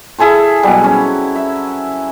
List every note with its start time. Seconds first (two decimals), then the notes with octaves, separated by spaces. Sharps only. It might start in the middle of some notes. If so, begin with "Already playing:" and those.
0.19 E4 G#4 A4 C5
0.63 B2 F#3 G3
0.84 C#4
1.35 E5